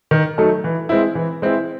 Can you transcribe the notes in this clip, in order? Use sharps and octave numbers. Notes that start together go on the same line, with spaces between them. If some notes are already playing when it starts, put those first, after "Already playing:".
D#3
F#3 A3 D#4 A4
E3
G#3 C4 E4
E3
G#3 C4 E4